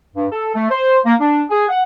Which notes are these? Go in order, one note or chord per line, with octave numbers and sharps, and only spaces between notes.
G2
A4
A3
C5
A#3
D4
G#4
F#5